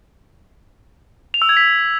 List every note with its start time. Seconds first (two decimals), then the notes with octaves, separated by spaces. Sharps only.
1.34 F7
1.42 E6
1.49 G#6
1.57 B6